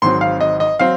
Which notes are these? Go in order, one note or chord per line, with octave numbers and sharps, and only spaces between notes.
G#1 G#2 F#3 C4 C6
F5
D#5
D#5
F#3 C4 F5